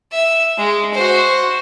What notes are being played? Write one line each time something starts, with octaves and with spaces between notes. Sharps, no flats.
E5
G#3
F#4 C5